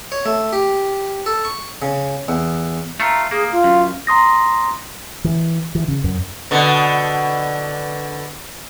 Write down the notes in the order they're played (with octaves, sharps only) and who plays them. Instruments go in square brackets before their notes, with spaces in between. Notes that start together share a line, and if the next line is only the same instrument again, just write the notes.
[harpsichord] C#5
A3
G4
A4
C#6
C#3
E2
[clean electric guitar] A3 F4 [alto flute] A#5
[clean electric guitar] A#3 [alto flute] G#4
[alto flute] F4
[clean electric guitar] F#2
[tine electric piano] A#5 C6 D#6 A#6
[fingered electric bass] E3
E3
C#3
F#2
[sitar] B2 D3